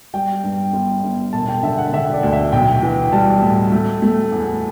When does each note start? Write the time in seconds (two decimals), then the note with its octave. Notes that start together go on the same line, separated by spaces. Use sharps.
0.14 G3 G5
0.44 G2
0.73 G1
1.03 G1
1.33 E1 A5
1.48 G5
1.63 D3 E5
1.78 F#5
1.93 D3 E5
2.13 D5
2.23 D2
2.33 E5
2.52 B1 G5
2.82 E3
3.12 G3 A5
3.42 A2
3.72 A3
4.02 A3
4.32 E2